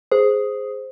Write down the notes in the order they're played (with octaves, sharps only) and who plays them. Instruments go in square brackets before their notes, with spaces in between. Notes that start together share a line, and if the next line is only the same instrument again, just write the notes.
[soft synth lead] G#4 [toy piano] C5